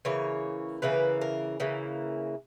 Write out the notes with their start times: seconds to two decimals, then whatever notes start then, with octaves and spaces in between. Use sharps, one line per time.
0.05 C#3 E3 A#3 C#5
0.82 C#3 E3 A#3 B4
1.21 A#4
1.60 C#3 E3 A#3